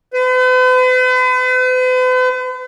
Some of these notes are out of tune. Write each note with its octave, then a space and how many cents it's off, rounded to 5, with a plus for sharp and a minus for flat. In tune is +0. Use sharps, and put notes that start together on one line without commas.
B4 +45